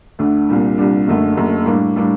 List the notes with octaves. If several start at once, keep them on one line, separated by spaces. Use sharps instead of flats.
D2 D3 A3 D4
C2 A#2 G3 D4
C2 A#2 G3 D4
F#1 F#2 D3 A3
F#1 F#2 D3 A3
A2 G3 A#3 D4
A2 G3 A#3 D4